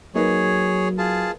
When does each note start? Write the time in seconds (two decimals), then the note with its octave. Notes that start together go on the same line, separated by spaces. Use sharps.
0.15 F#3 A#3 D#4 G#4 B4 C#5
0.98 F4 G#4 A5